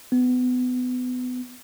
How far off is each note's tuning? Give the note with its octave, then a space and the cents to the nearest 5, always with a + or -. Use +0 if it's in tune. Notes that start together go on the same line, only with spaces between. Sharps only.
B3 +25